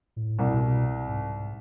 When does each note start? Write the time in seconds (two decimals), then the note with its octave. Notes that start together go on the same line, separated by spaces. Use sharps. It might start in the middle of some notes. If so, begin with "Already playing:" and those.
0.16 A2
0.39 C2 B2
1.09 G#2